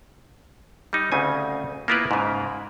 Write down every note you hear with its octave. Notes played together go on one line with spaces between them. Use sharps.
G3 D#4
D2 C#3 C4 G#5
A#3 B3 E4 F4 A#4 B4
G#2 C#3